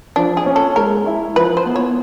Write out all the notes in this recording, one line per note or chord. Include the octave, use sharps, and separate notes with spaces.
F3 D4
G#4
C#4
A4
G#3 A#4
E4
F3 B4
C5
B3
C#5